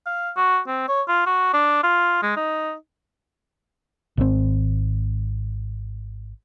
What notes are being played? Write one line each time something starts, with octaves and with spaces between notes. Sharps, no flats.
F5
F#4
C4
C#5
F4
F#4
D4
F4
G#3
D#4
G#1 C3 C4